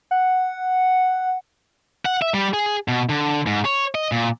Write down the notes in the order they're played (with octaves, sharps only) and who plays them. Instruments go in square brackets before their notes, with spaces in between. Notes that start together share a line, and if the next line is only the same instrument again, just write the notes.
[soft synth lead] F#5
[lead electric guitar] F#5
E5
G3
G#4
B2
D3
G#2
C#5
D#5
A#2